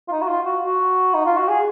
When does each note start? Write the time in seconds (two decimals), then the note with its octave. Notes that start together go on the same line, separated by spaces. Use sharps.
0.08 F4
0.12 D#4
0.22 F#4
0.28 F4
0.45 F#4
0.62 F#4
1.14 D#4
1.26 F4
1.38 F#4
1.49 G#4